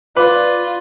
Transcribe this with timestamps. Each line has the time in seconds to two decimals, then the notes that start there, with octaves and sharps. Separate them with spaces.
0.17 F4 B4 D5 D6